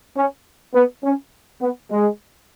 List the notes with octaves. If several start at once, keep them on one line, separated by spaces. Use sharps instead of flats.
C#4
B3
C#4
B3
G#3